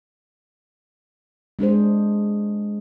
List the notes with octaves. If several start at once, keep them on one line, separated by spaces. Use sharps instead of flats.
G#3 D4 G#4 C5